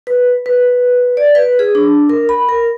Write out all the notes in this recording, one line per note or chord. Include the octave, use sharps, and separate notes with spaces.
B4
B4
D5
B4
G#4
D4
A#4
B5
A#4